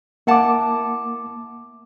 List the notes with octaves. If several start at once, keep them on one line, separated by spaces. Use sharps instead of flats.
A#3 E4 F#5 A5 D6